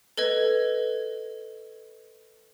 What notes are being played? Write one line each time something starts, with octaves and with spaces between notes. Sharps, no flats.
A4 B4 D#5 G#6